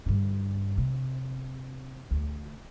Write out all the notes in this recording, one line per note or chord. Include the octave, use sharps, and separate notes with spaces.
G2 D3
C3
D2